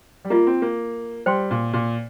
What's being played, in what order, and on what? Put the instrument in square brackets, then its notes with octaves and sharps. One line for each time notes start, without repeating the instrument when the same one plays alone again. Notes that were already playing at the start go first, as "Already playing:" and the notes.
[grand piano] G3
[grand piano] A#3 [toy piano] F4 D#5 A#5
[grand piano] C4
A#3
[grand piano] G3 [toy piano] C5 G5 C6
[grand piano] A#2
A#2